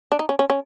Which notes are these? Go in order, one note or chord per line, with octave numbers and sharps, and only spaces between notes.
D4
D#4
C#4
C#4
C#4